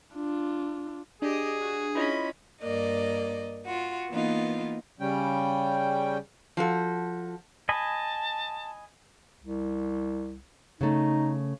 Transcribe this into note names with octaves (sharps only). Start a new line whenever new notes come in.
D4 F4
D4 G4 G#4 D#5
F#4
C#4 E4 F4 D#5 B5
G2 A#3 D5 D#5
F4 F#4
E3 A#3 B3 D#4 F4
C#3 G3 C#4 G5
F3 F#4 A4
D#5 G#5 A5 B5
C2
C#3 A3 D#4